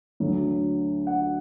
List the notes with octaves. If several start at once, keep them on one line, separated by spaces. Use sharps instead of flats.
D2 D3 F#3
F#5